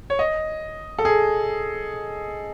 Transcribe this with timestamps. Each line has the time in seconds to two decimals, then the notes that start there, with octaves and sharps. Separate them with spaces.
0.10 C#5
0.19 D#5
0.99 A4
1.05 G#4